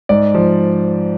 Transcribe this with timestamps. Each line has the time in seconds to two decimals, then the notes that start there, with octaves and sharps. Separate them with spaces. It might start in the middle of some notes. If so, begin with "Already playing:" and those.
0.09 G#2 D5
0.34 F3